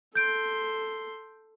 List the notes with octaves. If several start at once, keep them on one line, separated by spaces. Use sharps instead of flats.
A4 C6 G6 D7